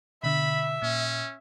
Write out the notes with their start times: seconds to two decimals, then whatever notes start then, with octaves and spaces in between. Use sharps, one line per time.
0.23 B2 D3 E5 B5
0.82 A#2 C#4